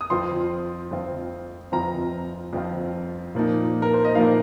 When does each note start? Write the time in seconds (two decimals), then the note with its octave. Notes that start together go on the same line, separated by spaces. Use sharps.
0.01 D#6
0.10 F2 F3 C4 F4 C6
0.91 F2 F3 C4 F4
1.72 F2 F3 C4 F4 A#5
2.53 F2 F3 C4 F4
3.35 A#2 F3 A#3 D#4
3.82 A#4
3.94 C5
4.05 D#5
4.15 A#2 F3 A#3 D#4 F5